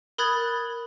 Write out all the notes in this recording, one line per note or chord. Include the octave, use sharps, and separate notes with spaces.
A#4 B5 D#6 F#6 G#6 A6